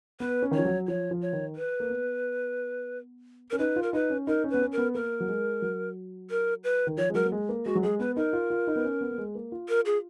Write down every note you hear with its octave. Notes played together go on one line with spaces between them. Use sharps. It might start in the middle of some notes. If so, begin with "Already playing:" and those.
B3 B4
C#4
D#3
F3 C#5
F#3
F3 C#5
F3
C#5
D#3
B4
A#3
B3
C#4 A#4
D#4 B4
F4
A#4
D#4 B4
C#4
D#4 A#4
C#4
B3 B4
C#4
A#4
B3
A#3 A#4
F#3
G#3
F#3
A#4
B4
D#3
F3 C#5
G#3
F#3 A#4
A#3
G#3
A#3
G#3 F#4
F#3
G#3 G#4
B3 B4
D#4 A#4
F4
F4
D#4
B3
C#4
B3
A#3
G#3
A#3
F4
A#4
G#4